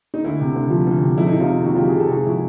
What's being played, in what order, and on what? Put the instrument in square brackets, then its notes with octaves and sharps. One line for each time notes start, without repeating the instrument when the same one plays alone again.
[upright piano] D#4
D2 E4
C3
D2
F3
D2
C3
F2 E4
D#4
C3 E4
D#4 F4
F2
D#3 E4 F#4
F2 F4 G4
F#4 G#4
C3 G4 A4
G#2 F#4 G#4
F3 E4 F#4